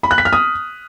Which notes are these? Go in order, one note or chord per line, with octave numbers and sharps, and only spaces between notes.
B5
F#6
B6
F6
D#6